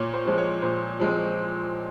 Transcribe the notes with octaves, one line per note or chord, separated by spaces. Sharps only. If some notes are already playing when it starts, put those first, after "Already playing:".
Already playing: A#2 C#5
C5
F3 G#3 C4
C#5
A#2 C5
F3 G#3 C4